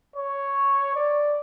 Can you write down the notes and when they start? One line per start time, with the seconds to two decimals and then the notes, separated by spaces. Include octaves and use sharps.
0.16 C#5
0.96 D5